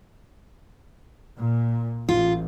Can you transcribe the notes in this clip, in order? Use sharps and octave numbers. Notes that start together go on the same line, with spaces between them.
A#2
A1 F4